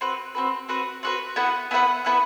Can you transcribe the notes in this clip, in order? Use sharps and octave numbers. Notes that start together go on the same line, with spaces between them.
C4 F#4 B4
C4 F#4 B4
C4 F#4 B4
C4 F#4 B4
B3 E4 B4 F#5
B3 E4 B4 F#5
B3 E4 B4 F#5